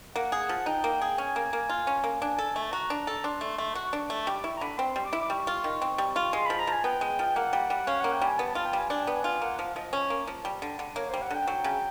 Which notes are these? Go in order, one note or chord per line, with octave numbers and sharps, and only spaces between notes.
A#3 F#5
G#4
F3
D#4 G5
A#3
G#4
C#4 G#5
A#3
A#3
F4
C#4
A#3
D4 G#5
A4
A3
A5
F#4 A#5
D4
A4
D4 C6
A3
A3
F#4 C#6
D4
A3
G3 D6
E4 C#6
A#5
D3 B5
C4 C6
G3
D6
E4
D6
G3 C#6
F4
D#3
C4
G3
F4
G#3 C6
F3 B5
A#5
F3 G#5
B3 G5
G#3
F3
A#3 F#5
G3
G3
C#4 F5
A#3 F#5
G5
G3 G#5
B3 A5
F4 A5
G5
G3 G#5
D4 G#5
B3 G5
G#5
F4
A#3 F#5
F3 F5
F3 D#5
C#4
A#3
F3
G3
D3
D3
A#3 C#5
G3 C5
F#5
D3 G5
F#3 G5
C#3